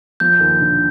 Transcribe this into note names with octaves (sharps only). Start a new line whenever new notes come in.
F3 G6
D#2
D3